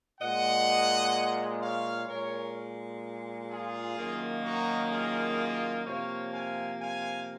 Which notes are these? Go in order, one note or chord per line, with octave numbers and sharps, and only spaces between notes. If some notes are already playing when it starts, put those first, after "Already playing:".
A#2 G#3 D#5 F#5
C#5 F5
A#2 G#3 A#4 C#5
F4 G#4
F#2 D#3 A#3
D#4 F#4
F4 G#4
C3 F3 A#3 C#5 F5
F5 G#5
F5 G#5